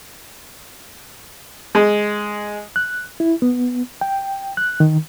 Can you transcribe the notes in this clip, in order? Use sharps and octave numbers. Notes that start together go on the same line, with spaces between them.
G#3
F#6
E4
B3
G5
F#6
D#3